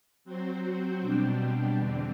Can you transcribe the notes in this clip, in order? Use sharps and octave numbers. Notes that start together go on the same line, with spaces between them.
F#3 C4 F#4 C5
B2 G3 D4 G4
E2 D3 G3 C4